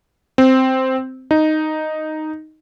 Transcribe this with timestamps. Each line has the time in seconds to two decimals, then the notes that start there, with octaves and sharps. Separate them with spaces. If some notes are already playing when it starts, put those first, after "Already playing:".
0.38 C4
1.31 D#4